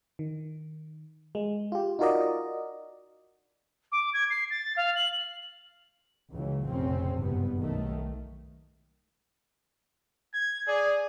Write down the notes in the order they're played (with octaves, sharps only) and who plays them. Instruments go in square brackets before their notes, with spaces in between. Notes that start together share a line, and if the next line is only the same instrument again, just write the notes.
[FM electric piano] D#3
G#3
F4 G4
D#4 F4 F#4 A#4 D5 D#5
[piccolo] D6
G#6
C7
A6
F5
F#7
[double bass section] C#2 C#3 E3 F#3
F1 A#1 F2 C#3 C4 C#4
F#1 G2 C3 G3 B3
B1 D#3 A3
[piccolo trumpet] G#6
[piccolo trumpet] G#4 [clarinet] D5